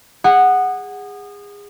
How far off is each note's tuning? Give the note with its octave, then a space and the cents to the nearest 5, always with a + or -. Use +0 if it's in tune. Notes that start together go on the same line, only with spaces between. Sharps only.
G#4 -25 F#5 +0